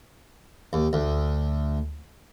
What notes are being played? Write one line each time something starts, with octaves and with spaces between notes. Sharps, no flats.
D#2
D2